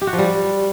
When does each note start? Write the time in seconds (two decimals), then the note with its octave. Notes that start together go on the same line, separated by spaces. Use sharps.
0.01 G4
0.07 F#4
0.13 F3
0.18 G3